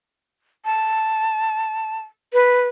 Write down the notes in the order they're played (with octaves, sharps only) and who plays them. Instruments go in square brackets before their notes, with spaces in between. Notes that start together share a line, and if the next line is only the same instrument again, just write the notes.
[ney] A5
[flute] B4